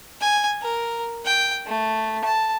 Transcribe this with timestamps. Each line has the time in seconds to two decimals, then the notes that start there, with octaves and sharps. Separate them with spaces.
0.21 G#5
0.62 A#4
1.26 G5
1.67 A3
2.24 A5